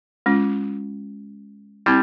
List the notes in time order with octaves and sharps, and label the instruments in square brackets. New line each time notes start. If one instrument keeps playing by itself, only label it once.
[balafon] G#3 C#4 F4
[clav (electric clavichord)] G3 [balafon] C4 E4